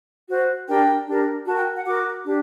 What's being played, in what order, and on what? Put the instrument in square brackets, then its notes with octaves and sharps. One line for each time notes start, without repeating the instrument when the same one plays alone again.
[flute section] F#4 C5
D4 G4 A#4 G5
D4 G4 A#4
F#4 A#4 A5
G5
F#5
F#4 A#4 D6
D4 G4